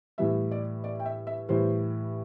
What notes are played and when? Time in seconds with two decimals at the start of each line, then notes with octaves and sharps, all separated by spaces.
0.18 A2 E3 G3 E5
0.51 D5
0.84 D5
0.99 G5
1.05 E5
1.27 E5
1.49 A2 E3 G3 C5